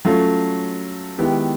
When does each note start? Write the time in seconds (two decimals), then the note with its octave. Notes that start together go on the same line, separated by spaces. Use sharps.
0.05 F#3 A3 C#4 F4 A4
1.18 D#3 G#3 B3 E4 G4